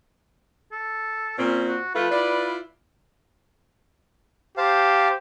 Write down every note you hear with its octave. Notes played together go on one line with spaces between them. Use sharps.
A4
A#2 C4 C#4
F#4
F3 A3 F4 B4
E4 F4 D5
G4 C5 F5 A5